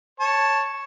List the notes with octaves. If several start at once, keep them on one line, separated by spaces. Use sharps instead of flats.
C#5 A5